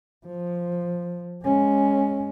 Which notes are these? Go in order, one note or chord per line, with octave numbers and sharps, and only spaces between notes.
F3
G#3 C#4